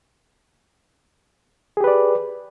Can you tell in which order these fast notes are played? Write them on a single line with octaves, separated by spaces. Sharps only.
G#4 G4 B4 D5